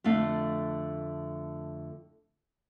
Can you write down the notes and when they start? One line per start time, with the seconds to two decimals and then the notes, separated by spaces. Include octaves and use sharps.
0.04 F2 D3 A3 F5